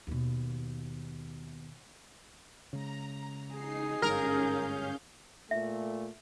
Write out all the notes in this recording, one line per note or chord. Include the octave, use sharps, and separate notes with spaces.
D#2 B2
C#3 G#3 A#5
D#4 G#4 C7
G1 G#2 C#4 A#4 F5 G6
A#2 A3 E5